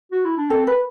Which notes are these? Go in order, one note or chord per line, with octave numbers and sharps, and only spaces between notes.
F#4
E4
D4
C4 A4
B4